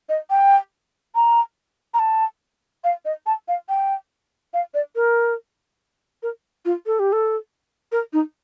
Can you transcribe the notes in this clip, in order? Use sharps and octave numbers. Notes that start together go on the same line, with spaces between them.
D#5
G5
A#5
A#5
A5
F5
D#5
A5
F5
G5
F5
D5
A#4
A#4
F4
A4
G4
A4
A#4
D#4